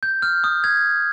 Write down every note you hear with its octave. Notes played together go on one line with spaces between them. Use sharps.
G6
F6
D#6
G#6